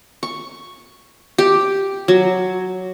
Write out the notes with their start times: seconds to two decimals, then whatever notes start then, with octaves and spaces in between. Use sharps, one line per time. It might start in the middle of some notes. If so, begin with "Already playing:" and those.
0.23 C#6
1.38 G4
2.08 F#3